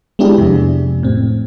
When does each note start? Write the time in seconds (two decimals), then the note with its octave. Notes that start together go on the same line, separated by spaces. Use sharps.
0.19 G#3 B3 D4 E4 G4 G#4
0.38 F2 C3
1.03 A2 C4